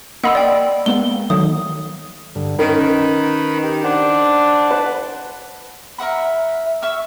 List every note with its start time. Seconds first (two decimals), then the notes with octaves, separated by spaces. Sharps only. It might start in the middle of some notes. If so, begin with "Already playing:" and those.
0.24 A#3 D#5 F#5 B5 C6 E6
0.35 D5 G5
0.86 G#3 A#3 B3 G7
1.30 D#3 F#3 A3 D#6
2.35 G2 D3
2.59 D#3 C#4 A#4 B4 D#5 B5
3.64 G4
3.84 D4 C5 F#5 A5
4.71 B4
5.98 A#4 E5 F#5 B5
6.82 E5 C#6 E6 F6